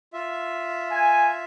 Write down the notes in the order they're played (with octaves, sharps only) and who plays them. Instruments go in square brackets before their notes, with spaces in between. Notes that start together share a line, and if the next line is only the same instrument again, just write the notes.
[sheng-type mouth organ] F4 E5
[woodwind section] G#5